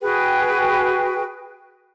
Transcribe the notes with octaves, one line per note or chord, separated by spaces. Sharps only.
F#4 G#4 B4 G5